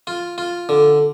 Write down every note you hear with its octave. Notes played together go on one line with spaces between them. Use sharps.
F4
F4
D3